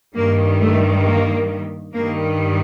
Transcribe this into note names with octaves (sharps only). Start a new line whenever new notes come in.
G2 D#3 G3 A#3
A3
A#3
G2 D#3 G3 A#3